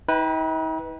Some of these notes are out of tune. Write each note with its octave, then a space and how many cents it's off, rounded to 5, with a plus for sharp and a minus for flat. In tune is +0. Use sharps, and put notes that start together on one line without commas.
D#4 +45 B4 +0 G5 +0